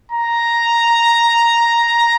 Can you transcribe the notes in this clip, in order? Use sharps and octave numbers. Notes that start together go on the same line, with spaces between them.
A#5